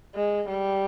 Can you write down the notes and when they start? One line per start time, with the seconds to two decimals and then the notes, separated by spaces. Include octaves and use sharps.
0.15 G#3
0.49 G3